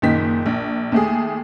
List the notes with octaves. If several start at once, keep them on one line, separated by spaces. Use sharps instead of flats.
F#1 A#2 D#3 B6
A#1
D#2 A3 G#4